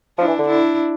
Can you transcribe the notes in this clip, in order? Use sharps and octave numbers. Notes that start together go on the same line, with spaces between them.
F3 D4 E4
E3
D3
D4 E4